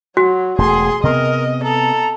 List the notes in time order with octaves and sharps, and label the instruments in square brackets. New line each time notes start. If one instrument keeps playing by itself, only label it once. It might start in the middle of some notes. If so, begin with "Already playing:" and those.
[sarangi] F#3 [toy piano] F#4
[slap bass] E1 A3 [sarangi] G#4 [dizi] C6
[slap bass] C3 B3 [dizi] A#4 [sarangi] D#5
[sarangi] A4 [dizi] A#5